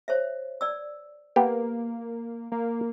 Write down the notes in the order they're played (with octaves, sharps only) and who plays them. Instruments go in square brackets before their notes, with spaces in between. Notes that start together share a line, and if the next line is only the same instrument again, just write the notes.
[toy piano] C5 C#5 E5
D5 E6
[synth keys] A#3 [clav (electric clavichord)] B3 G4
[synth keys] A#3